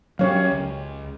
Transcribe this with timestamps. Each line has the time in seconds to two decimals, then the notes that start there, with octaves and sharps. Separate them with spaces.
0.19 F#3 C#4 G4 C#5 F5
0.52 C#2